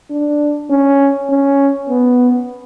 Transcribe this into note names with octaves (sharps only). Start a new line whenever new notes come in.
D4
C#4
C#4
B3